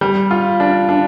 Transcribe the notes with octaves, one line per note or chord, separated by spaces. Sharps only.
G3
F4
D4
D4